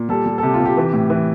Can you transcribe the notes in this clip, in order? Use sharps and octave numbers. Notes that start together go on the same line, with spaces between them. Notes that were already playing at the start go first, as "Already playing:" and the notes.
Already playing: A#2
G3 A4
G3
A4
C3 G4
F4
C3
G4
E3
A2
E3